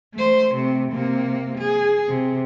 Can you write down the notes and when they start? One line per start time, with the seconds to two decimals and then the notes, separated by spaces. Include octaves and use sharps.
0.14 A3 C5
0.55 C3 A3
0.92 C3 A#3
1.58 G#4
2.08 C3